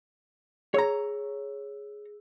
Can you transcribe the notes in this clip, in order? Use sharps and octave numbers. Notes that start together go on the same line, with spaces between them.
G#4 C#5 A#5 E6